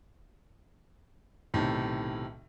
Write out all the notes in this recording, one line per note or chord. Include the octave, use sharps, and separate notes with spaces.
B1 A2 C3 D#3